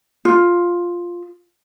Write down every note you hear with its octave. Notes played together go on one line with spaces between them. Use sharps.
F4